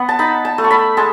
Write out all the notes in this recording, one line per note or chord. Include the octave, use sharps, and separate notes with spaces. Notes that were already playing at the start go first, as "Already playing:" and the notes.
Already playing: B3 F#5
A5
D#4 B5
A5
A3
C#6
B5
G#3 A5